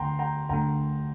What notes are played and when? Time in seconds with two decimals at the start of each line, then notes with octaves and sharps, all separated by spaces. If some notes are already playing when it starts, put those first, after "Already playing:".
Already playing: D2 D3 A3 G5 A#5 C6
0.19 G5 A#5
0.49 D2 D3 A3 G5 A#5